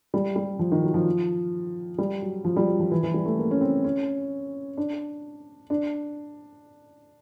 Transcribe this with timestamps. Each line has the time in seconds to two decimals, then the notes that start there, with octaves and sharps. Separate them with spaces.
0.14 G3
0.36 G3
0.59 F3
0.72 D#3
0.84 F#3
0.94 F3
1.98 G3
2.22 F#3
2.45 F3
2.56 G3
2.68 F#3
2.80 F3
2.91 E3
3.03 E3
3.14 G3
3.26 A3
3.38 A#3
3.51 C#4
3.61 C4
3.84 C#4
4.77 D4
5.70 D4